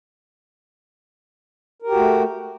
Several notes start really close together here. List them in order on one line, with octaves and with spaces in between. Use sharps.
A#4 G4 F#4 A3